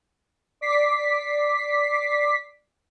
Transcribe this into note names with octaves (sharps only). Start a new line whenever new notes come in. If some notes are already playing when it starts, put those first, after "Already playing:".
D5 D6 B6 C7